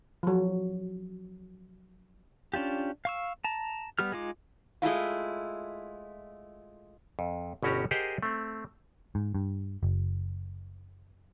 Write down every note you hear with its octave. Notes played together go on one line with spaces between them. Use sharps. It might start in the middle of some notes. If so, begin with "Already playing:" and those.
F3 F#3
C#4 D4 F4 G4
F5 C#6 E6
A5 A#5
G3 B3 G4 F6
G#3 D#4 F4 D6
G#3 A3 E4 F4
F2
G1 B2 C#4 F#4 G4 A#5
G4 G#4 A#4 C5 D#5 F#5
A3 C4
G#2
G2
F#1